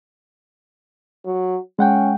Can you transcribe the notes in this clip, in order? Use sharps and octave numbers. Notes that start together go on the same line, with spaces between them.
F#3
G#3 C#4 F#5 G5